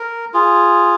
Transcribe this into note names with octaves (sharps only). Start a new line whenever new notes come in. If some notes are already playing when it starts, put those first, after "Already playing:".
Already playing: A#4
F4 G#4